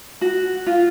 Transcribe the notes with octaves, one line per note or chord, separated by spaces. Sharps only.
F#4
F4